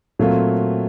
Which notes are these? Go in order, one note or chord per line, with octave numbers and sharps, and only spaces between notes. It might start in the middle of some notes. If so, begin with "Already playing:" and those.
A#2 F#3 A3 C4 F4